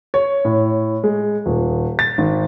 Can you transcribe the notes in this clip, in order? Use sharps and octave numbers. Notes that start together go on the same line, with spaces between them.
C#5
A2
G#3
D#1
A6
G#1